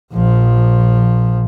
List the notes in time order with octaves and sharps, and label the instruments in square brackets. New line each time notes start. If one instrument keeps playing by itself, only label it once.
[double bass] A#1 F3